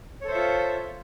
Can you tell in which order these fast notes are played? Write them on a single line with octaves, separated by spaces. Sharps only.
C#5 A4 C5 E5 F4